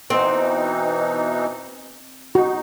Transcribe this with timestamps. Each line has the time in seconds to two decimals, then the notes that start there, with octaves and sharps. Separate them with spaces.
0.10 B2 E3 C4 D#4
2.35 D#4 F#4